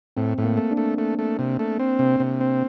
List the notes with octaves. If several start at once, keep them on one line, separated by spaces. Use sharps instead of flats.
A2 C4
A2
A#3
A3
D4
A3
A3
A3
C3
A3
C4
C3
C3
C4